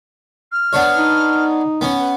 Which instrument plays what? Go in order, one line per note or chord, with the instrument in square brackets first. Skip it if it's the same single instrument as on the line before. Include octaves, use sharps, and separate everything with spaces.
[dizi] F6
[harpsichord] B3 D4 C#5
[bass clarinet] D#4
[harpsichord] B3 C#4
[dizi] B4